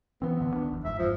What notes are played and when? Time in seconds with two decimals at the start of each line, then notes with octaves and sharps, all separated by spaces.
0.22 E3 B3 C4
0.40 A1 D3 E3
0.54 D2 D#3 D4
0.71 G1 E2
0.85 G1 F2 G#2 E5
0.99 F3